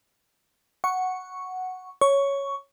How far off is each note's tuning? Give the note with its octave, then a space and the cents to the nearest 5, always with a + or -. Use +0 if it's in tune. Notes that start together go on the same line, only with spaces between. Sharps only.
F#5 +0 C#6 +0
C#5 +0 C#6 +10